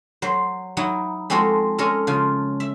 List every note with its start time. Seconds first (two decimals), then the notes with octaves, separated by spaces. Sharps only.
0.22 F#3 C5
0.77 F#3 D#4 E4 F#5
1.30 F3 G#3 C4 F#4 A4 C5
1.78 G#3 C#4 A4 A#4
2.07 C#3 F3 F4
2.60 E5